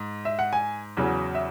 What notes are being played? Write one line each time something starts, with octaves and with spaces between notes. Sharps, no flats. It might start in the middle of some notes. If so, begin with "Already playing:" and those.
Already playing: G#2
E5
F#5
G#5
E2 C#3 F#3 C#4
E5